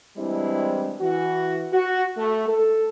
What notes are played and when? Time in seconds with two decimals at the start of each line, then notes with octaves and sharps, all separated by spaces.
0.17 E3 G3 G#3 C4 D4 E4
1.01 E3 F#4
1.73 F#4
2.17 A3
2.48 A4